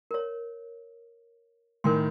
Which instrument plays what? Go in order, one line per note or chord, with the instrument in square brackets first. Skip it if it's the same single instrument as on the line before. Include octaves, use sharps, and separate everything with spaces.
[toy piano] A#4 C#5
[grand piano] A2 D#3 [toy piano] A#4 G#5 C6